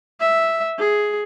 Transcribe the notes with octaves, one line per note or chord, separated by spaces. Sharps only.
E5
G#4